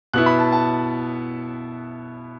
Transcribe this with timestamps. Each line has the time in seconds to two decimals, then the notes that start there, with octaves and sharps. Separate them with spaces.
0.13 B2 B3 E4 F#6
0.26 B5
0.39 A5
0.52 A5